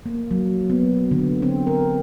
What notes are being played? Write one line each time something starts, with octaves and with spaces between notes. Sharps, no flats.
A#3
F#3
B3
D3
C4
A#4